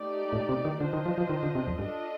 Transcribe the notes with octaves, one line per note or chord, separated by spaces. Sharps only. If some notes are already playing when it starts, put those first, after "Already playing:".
Already playing: A3 D#4 G4 D5
A2
C3
D#3
D3 D4 F4 C5 D#5
D#3
F3
F3
D#3
D3
C3
F2
G2 D4 F4 A4 D#5